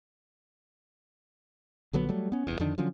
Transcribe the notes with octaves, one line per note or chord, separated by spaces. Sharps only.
A#1 D3 F#3 B3
F#3 G3 A3
B3 C#4
F1 E2
F2 D3 D#3 D4
D3 F3 F#3 C#4